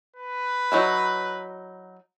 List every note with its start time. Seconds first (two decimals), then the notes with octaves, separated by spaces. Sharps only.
0.16 B4
0.72 F#3 D#4 E4